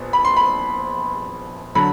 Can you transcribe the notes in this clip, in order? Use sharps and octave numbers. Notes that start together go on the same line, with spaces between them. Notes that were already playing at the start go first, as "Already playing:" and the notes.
Already playing: A#1 B3
B5
C6
B5
D3 F#3 B5